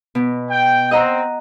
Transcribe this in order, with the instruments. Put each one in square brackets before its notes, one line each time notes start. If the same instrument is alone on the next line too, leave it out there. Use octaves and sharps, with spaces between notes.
[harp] B2
[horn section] G5
[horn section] C4 [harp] D#5 F#5 A#5